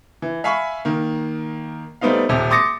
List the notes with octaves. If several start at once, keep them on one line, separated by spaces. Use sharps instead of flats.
E3
E5 F5 G#5 B5 C#6
D#3 A#3
G3 A3 B3 C4 D#4 F5
D#1 C3 G4
C6 D6 D#6 A6 A#6 C#7